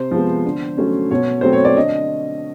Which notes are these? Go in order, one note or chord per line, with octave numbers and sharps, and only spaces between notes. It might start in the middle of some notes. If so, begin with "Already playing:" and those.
Already playing: C3 C5
F3 G#3 B3
D3
F#3 A3 C#4
B2 C#5
F#3 A3 C4 C5
C#5
D5
D3 D#5